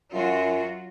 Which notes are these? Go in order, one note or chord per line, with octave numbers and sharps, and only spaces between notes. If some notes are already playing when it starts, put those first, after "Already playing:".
F#2 F#3 F4 F#4